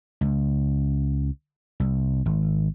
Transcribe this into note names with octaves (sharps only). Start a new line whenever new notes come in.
C#2
C2
G#1